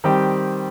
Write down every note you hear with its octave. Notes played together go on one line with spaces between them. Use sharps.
D#3 G3 C4 G4